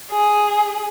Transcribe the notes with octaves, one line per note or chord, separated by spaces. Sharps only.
G#4